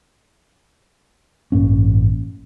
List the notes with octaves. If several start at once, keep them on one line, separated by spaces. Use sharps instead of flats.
A1 G2 A#3 C#4